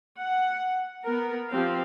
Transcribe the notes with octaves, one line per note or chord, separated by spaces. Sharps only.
F#5
B3 A#4
F3 C4 G4 F5